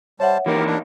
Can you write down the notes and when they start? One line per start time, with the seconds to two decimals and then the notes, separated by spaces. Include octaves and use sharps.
0.20 G3 C5 C#5 E5 F#5 A5
0.46 E3 A#3 D#4 G4 A#4
0.66 D4